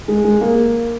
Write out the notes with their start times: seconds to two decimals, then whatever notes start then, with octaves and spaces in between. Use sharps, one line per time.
0.08 G#3
0.24 G#3
0.41 A#3